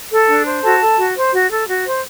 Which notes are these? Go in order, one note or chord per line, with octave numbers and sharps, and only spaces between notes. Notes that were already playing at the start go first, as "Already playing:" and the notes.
A4
D4
C5
F#4 A4 A5
A4
F#4
C5
F#4
A4
F#4
C5